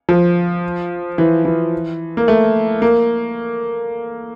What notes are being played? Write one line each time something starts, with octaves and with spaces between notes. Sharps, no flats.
F3
E3
E3
A#3
A3
A#3